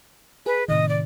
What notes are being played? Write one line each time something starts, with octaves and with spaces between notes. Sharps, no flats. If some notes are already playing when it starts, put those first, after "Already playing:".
G#4 B4
A2 C3 D#3 D#5
D5